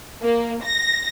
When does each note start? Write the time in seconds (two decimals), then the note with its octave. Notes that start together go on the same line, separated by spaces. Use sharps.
0.21 A#3
0.63 A#6